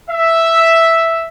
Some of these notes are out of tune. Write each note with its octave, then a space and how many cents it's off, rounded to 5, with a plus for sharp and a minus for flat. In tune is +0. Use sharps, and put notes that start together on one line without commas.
E5 +0